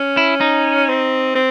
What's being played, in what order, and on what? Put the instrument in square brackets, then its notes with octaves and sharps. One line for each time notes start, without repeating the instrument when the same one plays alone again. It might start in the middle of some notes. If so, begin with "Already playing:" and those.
Already playing: [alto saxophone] C#4
[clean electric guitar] E4
D#4
[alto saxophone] C4
C4